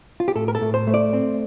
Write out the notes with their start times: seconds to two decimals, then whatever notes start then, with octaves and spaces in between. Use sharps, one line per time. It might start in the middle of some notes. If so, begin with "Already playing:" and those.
0.20 F4
0.28 G4
0.35 A2 A4
0.48 A#4
0.55 A4
0.61 A2
0.74 C5
0.87 A3
0.94 D5
1.13 C4